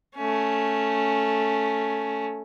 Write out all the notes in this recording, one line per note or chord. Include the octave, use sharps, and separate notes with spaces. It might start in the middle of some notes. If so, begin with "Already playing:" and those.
A3 C#4